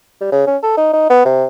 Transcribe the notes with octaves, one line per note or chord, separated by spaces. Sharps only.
G3
C#3
C#4
A4
D#4
D#4
B3
C3